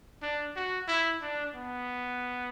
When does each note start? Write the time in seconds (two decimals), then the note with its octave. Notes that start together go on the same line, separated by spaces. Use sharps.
0.22 D4
0.56 F#4
0.88 E4
1.22 D4
1.55 B3